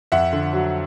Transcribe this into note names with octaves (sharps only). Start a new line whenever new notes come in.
F2 E5 F#5
D3
F#3